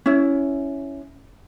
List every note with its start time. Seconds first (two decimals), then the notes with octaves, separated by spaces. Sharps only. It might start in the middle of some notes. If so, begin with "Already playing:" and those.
0.06 C#4 E4